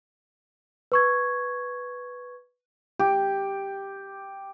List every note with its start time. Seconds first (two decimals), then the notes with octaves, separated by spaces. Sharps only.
0.92 B4 C#6 G#6
2.99 G4